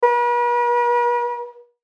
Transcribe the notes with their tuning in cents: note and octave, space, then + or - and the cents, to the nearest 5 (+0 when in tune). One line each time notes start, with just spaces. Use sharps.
B4 -45